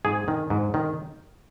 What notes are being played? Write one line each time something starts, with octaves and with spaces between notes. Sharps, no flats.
G#2 G#4
D#3
G#2
D#3